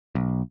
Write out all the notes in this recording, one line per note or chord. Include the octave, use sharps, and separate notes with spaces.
B1